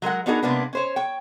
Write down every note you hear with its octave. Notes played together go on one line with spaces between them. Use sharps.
F#3 G#3 A#4 F#5
B3 D4 D#4 F#4 G#4 A#4
C3 G#3 A#3 B3 C#4 D4
C#4 C5 C#5
C#5 G5